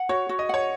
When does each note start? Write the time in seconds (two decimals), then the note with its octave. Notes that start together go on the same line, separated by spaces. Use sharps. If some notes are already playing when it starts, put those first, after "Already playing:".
Already playing: F#5
0.09 F#4 C#5
0.29 F#4
0.39 D#5
0.49 C#5 F#5